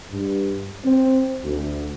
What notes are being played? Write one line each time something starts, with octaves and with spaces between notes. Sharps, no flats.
G2
C4
D2